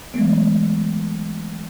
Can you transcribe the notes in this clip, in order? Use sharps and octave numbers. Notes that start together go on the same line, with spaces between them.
E3 F#3 G#3 A3 B3